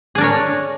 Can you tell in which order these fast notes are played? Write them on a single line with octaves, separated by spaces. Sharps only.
G#4 D4 A#4 C#5